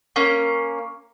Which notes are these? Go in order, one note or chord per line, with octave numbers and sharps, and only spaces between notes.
A#3 C#4